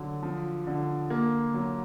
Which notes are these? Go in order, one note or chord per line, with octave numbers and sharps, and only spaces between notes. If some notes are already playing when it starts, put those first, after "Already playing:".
Already playing: D3 F#3
F3
D3
A#3
F#3